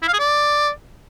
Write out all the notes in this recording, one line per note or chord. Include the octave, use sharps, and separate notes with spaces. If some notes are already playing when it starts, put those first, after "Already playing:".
E4
F5
G#4
D5